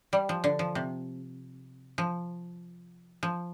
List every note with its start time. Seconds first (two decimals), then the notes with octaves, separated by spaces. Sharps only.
0.13 G3
0.29 F3
0.44 D3
0.59 F3
0.75 C3
1.98 F3
3.23 F3